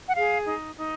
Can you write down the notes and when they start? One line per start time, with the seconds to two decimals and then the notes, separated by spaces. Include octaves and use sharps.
0.08 F#5
0.15 G#4 F5
0.46 D#4
0.75 D#4